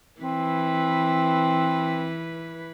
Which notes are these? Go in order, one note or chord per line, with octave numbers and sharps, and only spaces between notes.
E3 C4 B4